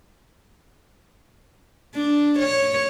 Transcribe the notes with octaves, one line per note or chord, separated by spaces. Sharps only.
D4
C#5